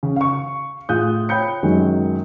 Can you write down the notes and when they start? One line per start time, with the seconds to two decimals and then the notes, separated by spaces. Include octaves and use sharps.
0.03 C#3
0.16 F5 C#6
0.89 A2 F4 G#4 D#6 F#6 G6
1.29 C#5 G5 B5 G6 C#7
1.63 F#2 D#3 F#3 G#3